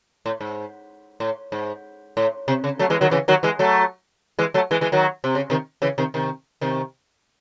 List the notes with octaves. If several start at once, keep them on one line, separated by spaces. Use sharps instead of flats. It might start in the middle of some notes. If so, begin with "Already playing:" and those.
A2
G#2
A2
G#2
A2
C3
C#3
F#3 A3
E3 G#3
D#3 F#3
C#3 E3
D#3 F#3
E3 G#3
F#3 A3
E3 G#3
F#3 A3
E3 G#3
E3 G#3
D#3 F#3
C3
C#3
C3 D#3
C#3 E3
C3 D#3
C3 D#3
C3 D#3